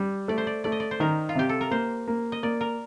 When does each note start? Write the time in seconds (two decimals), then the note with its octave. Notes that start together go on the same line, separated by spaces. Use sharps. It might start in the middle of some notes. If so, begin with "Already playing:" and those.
Already playing: G3
0.28 A3 D5
0.38 C5
0.47 D5
0.64 A3 D5
0.72 D#5
0.80 D5
0.91 C5
1.00 D#3 A#4
1.29 F4
1.35 C3 G4
1.49 A4
1.61 A#4
1.71 A#3 C5
2.08 A#3
2.32 D#5
2.43 A#3 D5
2.61 A#4